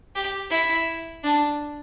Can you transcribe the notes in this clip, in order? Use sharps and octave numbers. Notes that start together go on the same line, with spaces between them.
G4
E4
D4